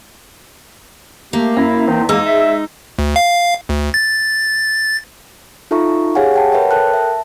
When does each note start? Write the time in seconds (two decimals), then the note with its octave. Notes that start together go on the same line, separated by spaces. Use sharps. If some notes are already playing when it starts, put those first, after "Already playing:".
1.33 A3 A#3 G4
1.57 F#2 E4 A#6
1.87 E2 C4 D#4
2.09 E2 G#3 A#3 D#4 E6
2.26 E5
2.99 D2
3.16 F5
3.69 D2
3.94 A6
5.71 D#4 F4 A4 E5 A#5 C#6
6.15 G4 G#4 C#5 F5 F#5 G#5
6.34 F#5 G5 A5
6.52 A#4 B4 C#5 E5 G5
6.71 A4 A#4 G5 A5 F#6
6.94 E5 A5